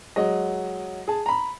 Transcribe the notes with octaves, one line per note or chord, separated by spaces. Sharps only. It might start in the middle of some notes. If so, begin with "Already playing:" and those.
F#3 G#3 D#5
G#4 A5
A#5 B5